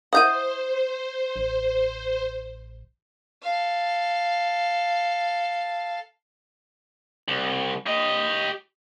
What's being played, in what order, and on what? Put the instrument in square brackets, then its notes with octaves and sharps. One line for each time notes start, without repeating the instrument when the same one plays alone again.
[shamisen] E4 D#5 F#5 [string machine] C5 [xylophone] D#6 G6 D#7
[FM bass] A1
[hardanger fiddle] A4 F5
[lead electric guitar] C2
G4 D#5